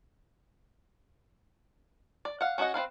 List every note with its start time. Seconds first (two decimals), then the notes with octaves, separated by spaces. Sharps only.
2.25 D5
2.41 F5 F#5
2.58 C#4 F#4 A#4 D#5 F#5
2.74 C4 E4 B4 F5